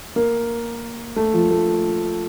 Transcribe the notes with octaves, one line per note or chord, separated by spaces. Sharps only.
A#3
A3
F3
A3